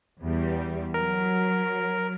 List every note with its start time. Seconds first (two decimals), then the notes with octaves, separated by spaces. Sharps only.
0.22 E2 G3
0.94 F#3 A#4